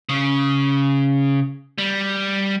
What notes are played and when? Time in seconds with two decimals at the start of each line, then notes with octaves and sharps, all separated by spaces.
0.09 C#3
1.78 G3